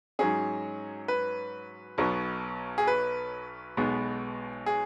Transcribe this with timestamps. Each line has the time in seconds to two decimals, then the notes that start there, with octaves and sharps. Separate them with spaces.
0.19 G#2 F#3 C#4 G#4
1.08 B4
1.98 B1 B2 F#3 B3
2.78 G#4
2.87 B4
3.77 B1 B2 G#3 B3
4.66 G#4